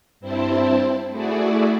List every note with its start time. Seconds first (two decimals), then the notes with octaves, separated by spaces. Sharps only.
0.20 G2 C4 E4 C5 A5
1.10 A3 E4 F#4 G#4 D5